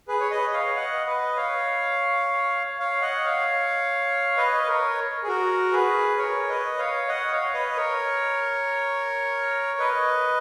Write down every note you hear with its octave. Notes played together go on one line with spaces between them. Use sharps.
G#4 B4
C#5
B4 D#5
C#5 F5
D#5 F#5
B4 D#5
C#5 F5
C#5 F5
D#5 F#5
C#5 F5
B4 D#5
B4
A#4 C#5
G#4
F#4 A#4
G#4 B4
A#4 C#5
B4 D#5
C#5 F5
D#5 F#5
C#5 F5
B4 D#5
A#4 C#5
B4 D#5